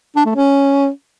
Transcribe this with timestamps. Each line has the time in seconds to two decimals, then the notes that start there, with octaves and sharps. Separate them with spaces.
0.16 D4
0.26 A3
0.35 C#4